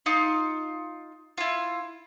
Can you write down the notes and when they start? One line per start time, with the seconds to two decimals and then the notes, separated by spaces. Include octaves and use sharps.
0.06 D#4 F4
1.38 E4 F4